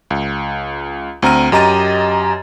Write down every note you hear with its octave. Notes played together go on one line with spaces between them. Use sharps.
C#2
D2 C4 A#5 F6 D#7
F#2 G4 D#5 A#5 A6 D#7